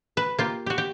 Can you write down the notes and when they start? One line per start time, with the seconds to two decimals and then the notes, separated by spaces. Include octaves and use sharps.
0.17 B4
0.38 A#3 F4 G4
0.66 F#4 G4
0.78 G4